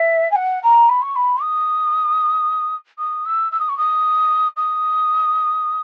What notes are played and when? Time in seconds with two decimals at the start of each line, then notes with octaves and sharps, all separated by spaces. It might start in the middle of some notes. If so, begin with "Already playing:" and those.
Already playing: E5
0.31 G#5
0.35 F#5
0.63 A#5
0.89 B5
1.02 C#6
1.15 B5
1.41 D#6
2.98 D#6
3.25 E6
3.51 E6
3.59 D#6
3.69 C#6
3.77 D#6
4.57 D#6